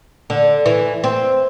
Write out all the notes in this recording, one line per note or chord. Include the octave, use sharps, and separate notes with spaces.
D3
E3
C4